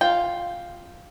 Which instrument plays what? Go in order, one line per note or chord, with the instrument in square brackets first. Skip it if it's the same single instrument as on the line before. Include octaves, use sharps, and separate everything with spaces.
[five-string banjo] F4 [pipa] G5